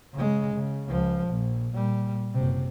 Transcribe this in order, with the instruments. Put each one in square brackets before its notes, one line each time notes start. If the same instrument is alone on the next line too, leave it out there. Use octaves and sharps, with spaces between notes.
[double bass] C#3 G#3
C#3
C#2 F3
A#1
A#2 G3
F#1 C3